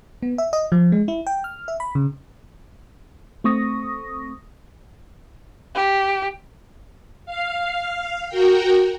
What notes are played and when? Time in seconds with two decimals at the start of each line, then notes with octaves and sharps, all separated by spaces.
0.22 B3
0.38 E5
0.53 D#5
0.72 F3
0.92 G#3
1.08 E4
1.27 G5
1.44 F6
1.68 E5
1.80 B5
1.95 C#3
3.44 A3 C4 C#6 D#6 A#6
5.75 G4
7.26 F5
8.29 F#4 A#4 G5